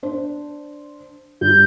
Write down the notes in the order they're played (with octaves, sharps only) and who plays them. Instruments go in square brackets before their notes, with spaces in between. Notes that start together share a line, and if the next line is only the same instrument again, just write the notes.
[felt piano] D4 C5
[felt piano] G2 [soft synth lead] G6